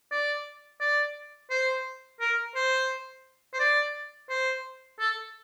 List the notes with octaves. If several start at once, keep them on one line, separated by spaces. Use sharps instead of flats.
D5
D5
C5
A#4
C5
C5
D5
C5
A4